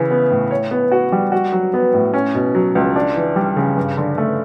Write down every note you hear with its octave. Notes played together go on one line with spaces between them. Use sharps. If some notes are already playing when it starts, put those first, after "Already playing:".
Already playing: C#3 E3 E4
B3
A2
C#5
B3
F#4
G3
F#4
F#3
B3
A2
C#4
B2
F#3
C#2
D4
E3
G3
C#3
G2
D3
A3